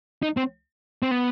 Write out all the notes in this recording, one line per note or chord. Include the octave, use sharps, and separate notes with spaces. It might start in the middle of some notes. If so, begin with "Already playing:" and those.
D#4
C4
C4
B3